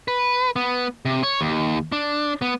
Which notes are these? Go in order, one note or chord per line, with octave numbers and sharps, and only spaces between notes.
B4
B3
C3
C#5
D#2
D4
B3